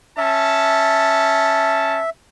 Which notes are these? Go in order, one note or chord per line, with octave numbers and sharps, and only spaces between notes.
C#4 E5 A5